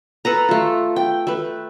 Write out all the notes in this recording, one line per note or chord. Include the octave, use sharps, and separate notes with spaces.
A4 B4 A#5
A3 F4
G5
A3 B4